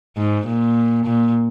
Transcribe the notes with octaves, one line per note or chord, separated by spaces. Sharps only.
G#2
A#2
A#2